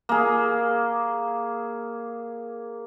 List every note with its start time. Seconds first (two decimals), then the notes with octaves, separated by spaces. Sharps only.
0.09 A#3 G#4